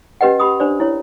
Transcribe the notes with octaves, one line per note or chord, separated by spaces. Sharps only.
C#4 G4 B4 D#5 F#5
G4 B5 D#6
D4 C5 D5
E4 C#5